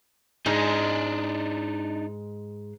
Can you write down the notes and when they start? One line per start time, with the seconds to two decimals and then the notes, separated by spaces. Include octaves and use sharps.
0.46 G#2 G#3 D4 D#4